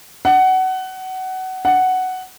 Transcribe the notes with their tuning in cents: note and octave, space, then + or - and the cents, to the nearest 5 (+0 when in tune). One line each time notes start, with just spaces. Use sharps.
F#5 +20
F#5 +5